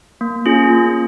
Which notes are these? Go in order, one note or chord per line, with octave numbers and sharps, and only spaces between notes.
A#3
C#4 F4 G#4
A#3